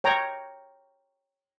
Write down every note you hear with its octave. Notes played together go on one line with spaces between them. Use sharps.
C#5 G5 A#5